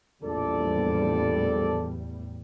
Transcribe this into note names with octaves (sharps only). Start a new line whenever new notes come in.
A#1 E2 A2 G3 A4 D5